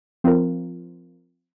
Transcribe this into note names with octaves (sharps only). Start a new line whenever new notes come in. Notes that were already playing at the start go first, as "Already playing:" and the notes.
F3 C4 F4 A#4